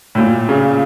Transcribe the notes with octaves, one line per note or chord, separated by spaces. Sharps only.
A2
A#2
C#3